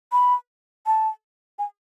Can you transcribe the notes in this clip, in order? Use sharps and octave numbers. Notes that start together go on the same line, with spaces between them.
B5
A5
G#5